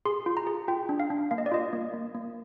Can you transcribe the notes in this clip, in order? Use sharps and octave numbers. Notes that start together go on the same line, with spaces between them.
G#4 C6
F4
A#5
G#4
F4 G5
D4
F5
D4
A#3 F5
D#5
D5
F4 D#5
A#3
A#3
A#3